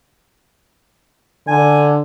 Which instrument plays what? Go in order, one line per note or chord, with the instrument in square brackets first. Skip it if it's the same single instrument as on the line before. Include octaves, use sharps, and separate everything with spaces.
[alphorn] D3 [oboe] G#5